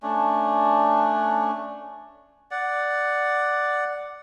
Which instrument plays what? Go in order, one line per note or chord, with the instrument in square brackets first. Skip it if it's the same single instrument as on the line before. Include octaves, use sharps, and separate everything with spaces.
[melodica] A3 C#4 D4
D5 F#5